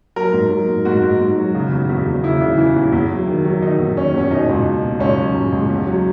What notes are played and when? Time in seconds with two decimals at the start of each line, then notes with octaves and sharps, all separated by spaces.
0.16 F#3 A#4
0.33 G#2
0.50 F#3
0.68 G#2
0.85 G#2 F#4
1.03 G#2
1.20 G#2
1.37 F#3
1.55 C#3
1.72 E2
1.89 E2
2.06 E2
2.23 C#3 E4
2.41 C#3
2.58 E3
2.76 E2
2.92 E2
3.11 F#3
3.27 D#3
3.45 F#3
3.62 D#3 D#4
3.79 E2
3.97 D#3 C#4
4.14 E2 C#4
4.31 B2 D#4
4.49 C#2
4.65 B2
4.83 B2
5.00 C#2 C#4
5.18 F#3
5.35 C#2
5.52 C#2
5.69 E2
5.87 F#3